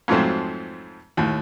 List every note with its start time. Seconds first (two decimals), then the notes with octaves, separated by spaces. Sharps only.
0.08 F2 G#2 F3 F#3 A3 C4
1.17 D#2 A2